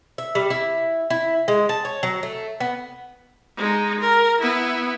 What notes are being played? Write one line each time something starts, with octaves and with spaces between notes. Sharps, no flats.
E5
G3
E4
E4
G#3
A5
C#5
F#3
A3
B3
G#3 D#4
A#4
B3 E4